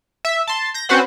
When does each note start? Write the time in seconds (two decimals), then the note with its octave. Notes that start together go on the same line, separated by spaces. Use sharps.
0.25 E5
0.47 A5 C6
0.74 G6 A#6
0.89 C4 C#4 F#4 B4 C5 F#5